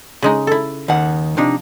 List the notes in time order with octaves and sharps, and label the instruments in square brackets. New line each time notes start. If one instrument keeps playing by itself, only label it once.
[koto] C#3 G#3 D#4
E4 A4
[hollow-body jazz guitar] D#2 D#3 F#5
[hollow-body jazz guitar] C3 D4 D#4 [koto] F3